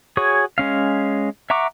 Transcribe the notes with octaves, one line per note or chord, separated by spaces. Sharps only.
F#4 G#4 C#5 G#5
G#3 C#4 F5
E5 F#5 A#5 C#6 D6